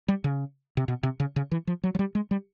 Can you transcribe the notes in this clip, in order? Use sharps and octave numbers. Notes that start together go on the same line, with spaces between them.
G3
C#3
C3
B2
C3
C#3
C#3
E3
F3
F#3
F#3
G3
G#3
G3